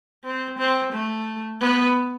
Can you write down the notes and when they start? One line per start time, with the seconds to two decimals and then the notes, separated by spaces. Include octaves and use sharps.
0.24 C4
0.58 C4
0.92 A3
1.61 B3